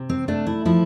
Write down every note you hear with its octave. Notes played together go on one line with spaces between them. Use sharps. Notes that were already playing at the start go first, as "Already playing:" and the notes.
Already playing: C3
C4
A3 D4
E4
F3 E4